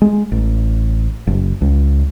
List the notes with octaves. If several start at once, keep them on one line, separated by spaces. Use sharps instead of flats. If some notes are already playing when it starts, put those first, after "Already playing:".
G#3
A1
F#1
C#2